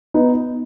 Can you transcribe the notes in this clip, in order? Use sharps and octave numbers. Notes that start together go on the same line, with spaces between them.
B3 D#4